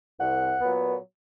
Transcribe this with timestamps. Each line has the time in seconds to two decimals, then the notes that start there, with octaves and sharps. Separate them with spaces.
0.18 C2 F#5
0.61 A#2 F#3 B3